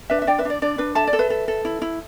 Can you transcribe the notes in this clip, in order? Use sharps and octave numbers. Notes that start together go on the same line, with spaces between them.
D4 B4 E5
E5
D4 D5 G5
B4 E5
D4 D5
D4 D5
D4 B4
A4 E5 A5
D5
A4
B4 E5
A4
A4
E4
E4